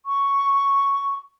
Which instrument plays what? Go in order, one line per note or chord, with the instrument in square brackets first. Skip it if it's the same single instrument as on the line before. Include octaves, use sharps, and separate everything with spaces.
[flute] C#6